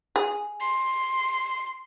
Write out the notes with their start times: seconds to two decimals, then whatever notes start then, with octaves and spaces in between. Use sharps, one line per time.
0.16 G#4
0.61 C6